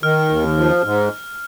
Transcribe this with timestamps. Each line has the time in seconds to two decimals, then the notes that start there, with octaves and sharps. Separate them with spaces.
0.03 D#3 F6
0.30 D#2
0.57 F3
0.84 G#2